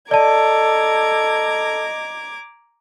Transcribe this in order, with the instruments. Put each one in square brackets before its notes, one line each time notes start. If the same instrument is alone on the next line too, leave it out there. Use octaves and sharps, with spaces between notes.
[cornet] A4 [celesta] D5 A5 [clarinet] D#5 [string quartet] A#5 D6 G#6